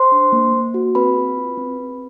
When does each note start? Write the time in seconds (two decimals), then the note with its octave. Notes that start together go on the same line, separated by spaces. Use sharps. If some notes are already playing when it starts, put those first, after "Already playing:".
Already playing: C5 C6
0.12 D4
0.32 A#3
0.53 A#3
0.74 F#4
0.95 C4 B4 B5
1.17 G#4
1.37 F4
1.57 C4
1.79 C4